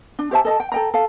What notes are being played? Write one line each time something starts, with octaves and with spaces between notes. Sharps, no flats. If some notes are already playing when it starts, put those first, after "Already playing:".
D4
G4 C5 E5 A5
A4 D#5 A5
G5
A4 G5 A#5
A4 F5